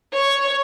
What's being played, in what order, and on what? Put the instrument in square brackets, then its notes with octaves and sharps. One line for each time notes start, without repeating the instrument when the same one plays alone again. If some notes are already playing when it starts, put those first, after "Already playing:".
[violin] C#5